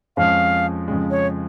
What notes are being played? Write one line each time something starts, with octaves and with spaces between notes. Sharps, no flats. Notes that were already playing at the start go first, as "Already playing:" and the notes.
F2 F3 G#3 C#4 F5
F2 C#3 G#3
C#5